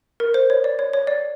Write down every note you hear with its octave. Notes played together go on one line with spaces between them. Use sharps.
A#4
C5
C#5
D5
C#5
C#5
D5